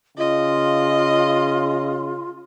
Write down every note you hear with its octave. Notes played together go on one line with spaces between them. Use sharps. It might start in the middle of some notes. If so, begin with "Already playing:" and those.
C#3 F4 D#5